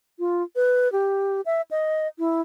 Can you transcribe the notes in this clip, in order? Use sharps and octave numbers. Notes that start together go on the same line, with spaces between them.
F4
B4
G4
E5
D#5
E4